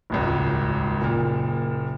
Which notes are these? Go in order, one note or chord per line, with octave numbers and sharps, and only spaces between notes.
D#1 G#1 C#2
F#1 A#2